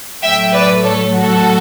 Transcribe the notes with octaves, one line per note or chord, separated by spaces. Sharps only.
A2 F#3 A3 E5 G5
B4 D5
A4 C#5
F#4 A4